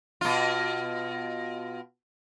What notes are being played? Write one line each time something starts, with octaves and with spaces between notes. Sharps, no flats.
B2 F4